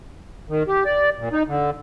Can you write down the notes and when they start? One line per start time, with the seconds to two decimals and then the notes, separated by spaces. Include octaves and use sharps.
0.49 D#3
0.68 G4
0.85 D5
1.18 A#2
1.33 D#4
1.47 D3